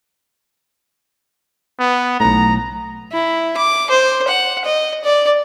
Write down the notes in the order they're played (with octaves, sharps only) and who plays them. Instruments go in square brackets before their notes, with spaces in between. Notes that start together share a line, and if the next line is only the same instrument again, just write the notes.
[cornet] B3
[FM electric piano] B1 A2 [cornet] A#5
[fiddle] E4
D6
C5
F#5
D#5
D5